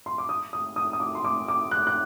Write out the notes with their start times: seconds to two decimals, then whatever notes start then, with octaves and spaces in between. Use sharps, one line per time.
0.06 C6
0.18 D6
0.29 D#6
0.53 D#6
0.76 D#6
0.93 D#6
1.00 D6
1.15 C6
1.25 D6
1.48 D6
1.71 F#6
1.87 F#6